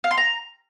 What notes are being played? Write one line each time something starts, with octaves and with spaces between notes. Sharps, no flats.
F5
C6
A#5